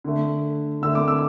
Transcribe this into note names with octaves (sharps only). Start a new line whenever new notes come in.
D3 A3
D3 A3 E6
D6
E6